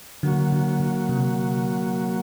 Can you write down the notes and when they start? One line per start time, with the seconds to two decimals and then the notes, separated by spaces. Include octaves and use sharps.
0.23 D3 F#3 A#3 F#4
0.53 D3
0.80 D3
1.09 C3